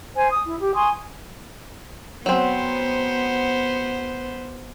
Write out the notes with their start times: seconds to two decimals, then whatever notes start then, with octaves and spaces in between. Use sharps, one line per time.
0.17 C5 G#5
0.31 D#6
0.45 E4
0.61 G4
0.75 G#5 C6 C#6 D#6
2.26 F#3 B3 C4 C5